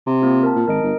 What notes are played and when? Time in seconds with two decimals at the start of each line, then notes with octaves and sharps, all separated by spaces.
0.07 C3
0.22 A#3 C4 F4
0.43 A#4 A5
0.56 A#2
0.68 G#1 A#4 D#5 D7
0.83 G1